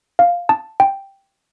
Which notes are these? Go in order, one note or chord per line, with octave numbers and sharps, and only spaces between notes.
F5
A5
G5